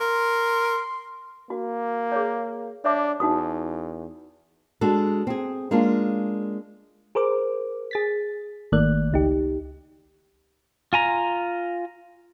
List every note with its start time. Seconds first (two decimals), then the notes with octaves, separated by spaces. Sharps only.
0.01 A#4 C6
1.50 A#3 F#4
2.12 G#4 C#5
2.85 D4 C#5 E5 D6
3.20 E2 D#4 F#4 D#6
4.81 G#3 D4 F#4 A4
5.27 C4 G#4
5.71 G#3 A#3 C#4 D4 F4
7.15 G#4 A#4 C5 D6
7.91 G#4 A6 B6
8.72 G#1 D#3 A3 A#3 D5 F#6
9.12 C#2 D#4 G4
10.93 F4 G#5 A#5